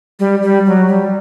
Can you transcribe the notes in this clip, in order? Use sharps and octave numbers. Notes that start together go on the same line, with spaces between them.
G3
G3
F#3
G3